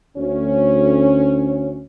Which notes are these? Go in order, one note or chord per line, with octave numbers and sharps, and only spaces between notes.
D2 C#4